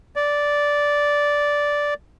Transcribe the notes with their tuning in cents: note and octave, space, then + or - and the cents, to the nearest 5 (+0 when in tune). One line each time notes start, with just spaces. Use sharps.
D5 -10